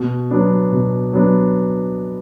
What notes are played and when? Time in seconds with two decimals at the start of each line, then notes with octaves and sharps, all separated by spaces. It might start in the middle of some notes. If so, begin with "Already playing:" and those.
Already playing: B2
0.30 F#3 B3 D4
0.72 B2
1.13 F#3 B3 D4